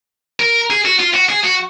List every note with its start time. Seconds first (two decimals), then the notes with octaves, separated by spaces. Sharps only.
0.40 A#4
0.70 G#4
0.85 F#4
0.99 F4
1.14 F#4
1.29 G#4
1.44 F#4